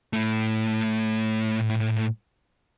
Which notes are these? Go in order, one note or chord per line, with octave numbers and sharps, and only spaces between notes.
A2 A3